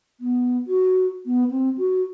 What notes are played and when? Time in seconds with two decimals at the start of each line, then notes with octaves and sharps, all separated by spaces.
0.20 B3
0.67 F#4
1.26 B3
1.51 C4
1.78 F#4